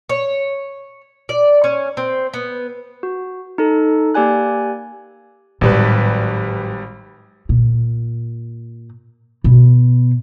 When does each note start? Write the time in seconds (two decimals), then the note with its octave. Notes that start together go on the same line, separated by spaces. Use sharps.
0.09 C#5
1.29 D5
1.64 C#4
1.97 C4
2.34 B3
3.03 F#4
3.58 D#4 A4
4.14 A#3 G4 D5 G#5 F#6
5.61 G#1 A2 F#3 G3 B4
7.49 A#2
9.44 B2